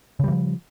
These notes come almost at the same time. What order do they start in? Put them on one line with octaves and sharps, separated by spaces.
C#3 G3 E3 F3